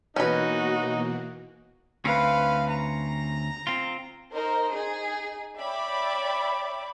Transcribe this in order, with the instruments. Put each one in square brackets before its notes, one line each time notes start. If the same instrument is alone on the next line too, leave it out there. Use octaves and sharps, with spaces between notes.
[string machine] B2 E3 A#3 [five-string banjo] C#4 B4 [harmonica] D#4 [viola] F#4
[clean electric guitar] D2 C4 C#4 [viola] B4 F5
[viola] A#5
[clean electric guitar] C4 F4
[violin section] D#4 A#4 C5 D#5
D#4 G#4
C#5 D5 E5 G5 B5 D6